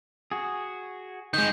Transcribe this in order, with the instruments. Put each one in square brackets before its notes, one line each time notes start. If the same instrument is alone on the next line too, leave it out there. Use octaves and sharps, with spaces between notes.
[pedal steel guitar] F#4 G#4
[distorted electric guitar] D#3 G#3 [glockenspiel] G6